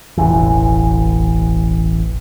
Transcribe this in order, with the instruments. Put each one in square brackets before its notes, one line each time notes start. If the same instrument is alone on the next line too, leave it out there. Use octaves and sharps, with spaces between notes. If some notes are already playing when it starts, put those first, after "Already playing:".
[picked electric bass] E1 A1 E3